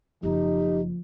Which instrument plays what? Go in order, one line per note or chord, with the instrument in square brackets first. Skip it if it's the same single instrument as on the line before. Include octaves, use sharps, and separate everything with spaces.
[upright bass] F#1 E4 [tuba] F3 [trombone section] D#4 [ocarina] G4